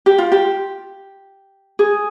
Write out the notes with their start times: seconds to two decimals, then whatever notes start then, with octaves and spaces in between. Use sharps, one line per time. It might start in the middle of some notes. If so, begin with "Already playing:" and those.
0.06 G4
0.18 F4
0.32 G4
1.79 G#4